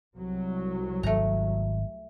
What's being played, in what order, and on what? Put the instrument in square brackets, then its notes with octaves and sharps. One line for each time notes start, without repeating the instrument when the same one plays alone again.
[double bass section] C2 F#3
[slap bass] G#1 [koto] A3 A#5